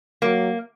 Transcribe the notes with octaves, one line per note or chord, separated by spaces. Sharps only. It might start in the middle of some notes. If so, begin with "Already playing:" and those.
F#3 A#3